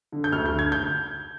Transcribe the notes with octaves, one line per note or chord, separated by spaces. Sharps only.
D3
G6
D2 F6
G6
D3
G#6
G6